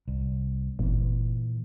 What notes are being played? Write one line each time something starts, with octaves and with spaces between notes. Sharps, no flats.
C2
G1 A#2 E3